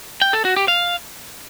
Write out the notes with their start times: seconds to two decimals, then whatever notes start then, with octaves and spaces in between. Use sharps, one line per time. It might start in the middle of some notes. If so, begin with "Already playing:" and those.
0.22 G5
0.33 A4
0.45 F#4
0.56 G4
0.68 F5